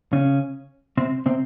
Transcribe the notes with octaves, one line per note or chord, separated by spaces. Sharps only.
C#3 C#4
C3 C4
C3 C4